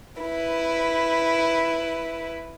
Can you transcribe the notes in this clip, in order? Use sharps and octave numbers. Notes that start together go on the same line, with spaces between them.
E4 B4